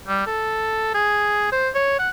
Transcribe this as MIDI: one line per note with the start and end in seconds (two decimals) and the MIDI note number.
0.08 0.24 55
0.27 0.89 69
0.94 1.52 68
1.52 1.69 72
1.74 1.98 73
1.99 2.10 78